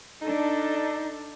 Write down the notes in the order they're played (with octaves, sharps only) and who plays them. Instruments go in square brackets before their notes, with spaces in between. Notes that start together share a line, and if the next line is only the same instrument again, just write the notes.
[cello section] D4 A4 [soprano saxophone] D#4